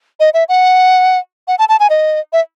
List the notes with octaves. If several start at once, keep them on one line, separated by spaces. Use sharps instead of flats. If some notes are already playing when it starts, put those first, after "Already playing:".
D#5
E5
F#5
F#5
A5
A5
G#5
D#5
E5